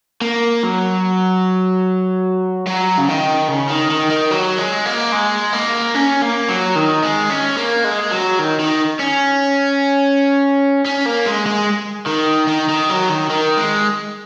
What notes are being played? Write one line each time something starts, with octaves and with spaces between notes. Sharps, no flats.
A#3
F#3
F#3
C#3
D#3
C#3
D#3
D#3
D#3
F#3
G#3
A#3
G#3
A#3
C#4
A#3
F#3
D#3
G#3
C#4
A#3
G#3
F#3
D#3
D#3
C#4
C#4
A#3
G#3
G#3
D#3
D#3
D#3
F#3
D#3
D#3
G#3